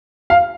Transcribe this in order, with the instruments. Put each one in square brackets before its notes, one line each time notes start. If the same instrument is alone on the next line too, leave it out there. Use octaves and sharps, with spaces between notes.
[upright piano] F5